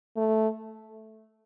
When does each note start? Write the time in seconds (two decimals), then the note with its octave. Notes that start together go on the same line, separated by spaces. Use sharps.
0.17 A3